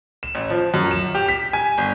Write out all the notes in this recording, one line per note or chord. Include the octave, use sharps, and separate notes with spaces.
E7
A1
F3
F#2
E7
G4
B6
G#5
G1